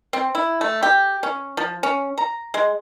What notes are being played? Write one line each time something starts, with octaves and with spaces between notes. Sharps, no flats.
C4
E4
A3
G4
C#4
F3
C#4
A#5
G#3